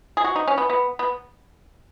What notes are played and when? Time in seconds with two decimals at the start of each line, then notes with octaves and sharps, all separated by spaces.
0.17 G#4
0.25 F#4
0.36 D#4
0.48 C#4
0.58 B3
0.70 B3
0.99 B3